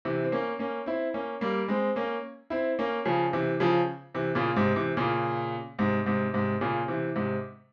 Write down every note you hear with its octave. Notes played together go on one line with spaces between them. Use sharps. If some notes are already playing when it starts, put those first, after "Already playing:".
C3 E3
C4
A#3 C#4
A#3 C#4
C4 E4
A#3 C#4
G3 A#3
G#3 C4
A#3 C#4
C4 E4
A#3 C#4
C#3 F3
C3 E3
C#3 F3
C3 E3
A#2 C#3
G#2 C3
C3 E3
A#2 C#3
G#2 C3
G#2 C3
G#2 C3
A#2 C#3
C3 E3
G#2 C3